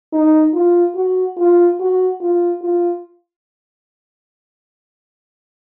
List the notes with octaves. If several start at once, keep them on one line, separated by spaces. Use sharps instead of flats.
D#4
F4
F#4
F4
F#4
F4
F4